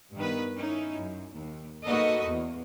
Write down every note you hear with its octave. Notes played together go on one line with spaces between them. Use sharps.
G2 D#3 B3 B4
C#4 D#4 E4
F#2
D#2
A#3 D#4 F#4 A4 B4 D#5
E2